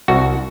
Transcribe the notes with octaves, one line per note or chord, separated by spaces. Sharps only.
C2 F#4